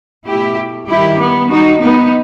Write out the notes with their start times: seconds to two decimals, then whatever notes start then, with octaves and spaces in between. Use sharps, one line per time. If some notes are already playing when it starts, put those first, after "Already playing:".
0.26 B2 A3 E4 G4
0.88 D#3 G3 E4 G4
1.19 B3
1.49 D#3 G3 D#4 F#4
1.80 B3 D#4